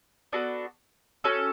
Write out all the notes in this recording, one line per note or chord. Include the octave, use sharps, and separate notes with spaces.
B3 D4 F#4 A4
C#4 F#4 A4